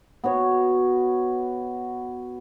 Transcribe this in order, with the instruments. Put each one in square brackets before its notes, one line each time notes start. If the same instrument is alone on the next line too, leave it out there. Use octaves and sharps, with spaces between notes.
[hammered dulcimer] B3 F#4 C#5